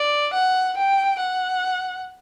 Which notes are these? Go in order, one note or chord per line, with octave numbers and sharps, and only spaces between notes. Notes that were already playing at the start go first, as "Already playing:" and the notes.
Already playing: D5
F#5
G5
F#5